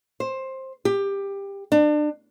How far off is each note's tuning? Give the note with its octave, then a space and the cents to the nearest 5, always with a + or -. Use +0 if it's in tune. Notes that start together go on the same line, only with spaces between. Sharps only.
C5 +15
G4 +15
D4 +30